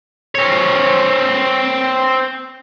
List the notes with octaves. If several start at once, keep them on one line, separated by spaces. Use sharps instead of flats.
C4 C#5